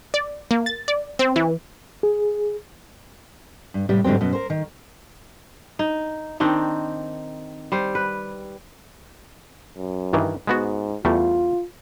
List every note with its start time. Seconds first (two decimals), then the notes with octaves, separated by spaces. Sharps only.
0.14 D5
0.51 A#3
0.66 A6
0.88 D5
1.19 C4
1.36 E3
2.03 G#4
3.74 G2
3.89 A2 C3 G3
4.04 G#2 D3 F#3 G3 C4
4.21 F#2 B2
4.33 A#4 C5
4.50 D#3
5.79 D#4
6.40 D#3 C4 D4 D#4
7.72 G3 C5
7.95 B4
9.77 F#2
10.13 G2 D#3 E3
10.47 G#2 G#3 B3 F#4
11.05 E2 G3 A3 F4